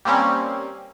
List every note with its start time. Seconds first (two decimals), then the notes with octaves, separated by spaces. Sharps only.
0.05 G3 A#3 C4 C#4